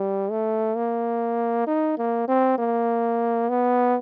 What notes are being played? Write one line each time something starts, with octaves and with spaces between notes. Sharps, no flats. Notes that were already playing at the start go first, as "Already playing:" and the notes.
Already playing: G3
A3
A#3
D#4
A#3
C4
A#3
B3